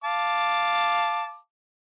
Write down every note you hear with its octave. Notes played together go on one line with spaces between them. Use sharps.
F5 A5 D6